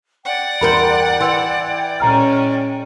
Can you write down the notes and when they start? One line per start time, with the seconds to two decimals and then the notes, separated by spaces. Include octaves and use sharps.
0.25 D5 F#5 G5
0.61 E2 A#4 C5 B5
1.20 E3 C6 E6
2.00 A#2 G#3 C#4 A#5 F6